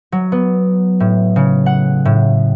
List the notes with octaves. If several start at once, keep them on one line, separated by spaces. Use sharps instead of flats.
F#3
B3
A2
C#3
F#5
A2